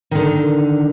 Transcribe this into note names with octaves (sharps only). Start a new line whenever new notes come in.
D3 D#3